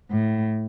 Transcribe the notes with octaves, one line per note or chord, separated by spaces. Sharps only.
A2